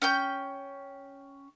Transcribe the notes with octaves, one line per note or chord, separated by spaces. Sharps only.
C#4 G5 G6